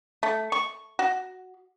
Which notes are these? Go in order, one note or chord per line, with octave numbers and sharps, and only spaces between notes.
A3
C#6
F#4